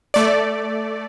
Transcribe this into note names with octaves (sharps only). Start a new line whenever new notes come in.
A3 D5